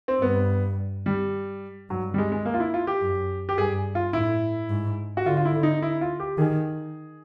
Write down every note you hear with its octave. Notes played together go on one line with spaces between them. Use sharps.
C4
G2 B3
G3
G2 F#3
G3
G#3
G#3
A#3
F4
E4
F4
G4
F#2
G4
G2 G#4
F4
A2 E4
G#2
F#4
D3 F4
F4
E4
D#4
E4
F4
G4
D#3 G#4